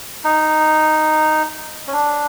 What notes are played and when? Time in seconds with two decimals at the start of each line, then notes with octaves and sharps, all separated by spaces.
0.24 D#4
1.88 C#4
1.93 D4